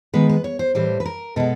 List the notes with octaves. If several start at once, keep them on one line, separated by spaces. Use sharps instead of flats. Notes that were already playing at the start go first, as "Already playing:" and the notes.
D#3 G#3 B3 B4
B4
C#5
C5
A2 E3 G3 C5
B4
A#4
B2 G#3 B3 A4